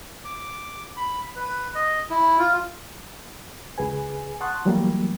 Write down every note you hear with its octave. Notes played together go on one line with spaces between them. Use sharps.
D6
B5
B4
D#5
E4
F4
C#2 G#4 B4 G#5
F#5 A5 C6 C#6 D#6 F#6
E3 F#3 G3 A3 A#3